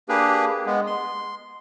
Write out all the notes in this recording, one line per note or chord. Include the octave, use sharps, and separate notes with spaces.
A#3 D4 G4 G#4 B4
G#3 B3
C6